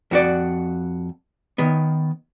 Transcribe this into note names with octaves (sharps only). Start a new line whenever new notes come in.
F2 F#4 D5
D#3 B3